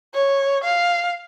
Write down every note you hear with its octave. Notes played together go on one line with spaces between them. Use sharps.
C#5
F5